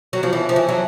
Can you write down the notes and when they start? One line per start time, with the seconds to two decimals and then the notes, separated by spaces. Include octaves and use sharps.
0.13 F#3
0.23 F3
0.33 E3
0.49 F3
0.56 E3
0.69 F#3